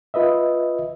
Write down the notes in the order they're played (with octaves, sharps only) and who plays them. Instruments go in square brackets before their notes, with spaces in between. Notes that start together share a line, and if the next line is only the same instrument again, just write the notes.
[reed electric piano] F4 B4 D#5 E5